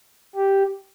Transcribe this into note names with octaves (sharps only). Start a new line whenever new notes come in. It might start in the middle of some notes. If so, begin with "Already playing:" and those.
G4